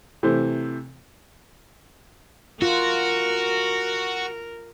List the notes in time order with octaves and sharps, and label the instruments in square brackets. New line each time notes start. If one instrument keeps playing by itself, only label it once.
[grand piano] C3 E3 A3 C5
[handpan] F4 [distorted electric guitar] F#4 [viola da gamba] A#4